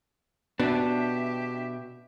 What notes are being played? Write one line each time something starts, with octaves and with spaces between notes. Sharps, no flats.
B2 B3 D4 G4 E5